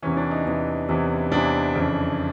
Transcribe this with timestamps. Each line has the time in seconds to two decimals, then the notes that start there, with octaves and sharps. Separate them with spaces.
0.02 E2 C3 E3 C#4
0.17 D4
0.31 D#4
0.46 E2 C3 E3
0.88 E2 C3 E3
1.32 E2 C3 E3 D4
1.75 F2 C#3 E3